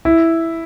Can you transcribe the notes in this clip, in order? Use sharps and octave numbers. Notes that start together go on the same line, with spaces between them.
E4